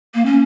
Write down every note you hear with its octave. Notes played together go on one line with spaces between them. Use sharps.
A#3
C#4